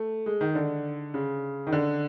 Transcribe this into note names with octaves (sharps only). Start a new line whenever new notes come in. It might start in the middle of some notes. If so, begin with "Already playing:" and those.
Already playing: A3
G#3
D#3
D3
C#3
D#3
D3